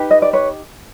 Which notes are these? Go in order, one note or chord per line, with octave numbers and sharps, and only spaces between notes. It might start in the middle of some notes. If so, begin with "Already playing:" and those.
Already playing: D#4 G4 B4
D#5
D5
B4 C#5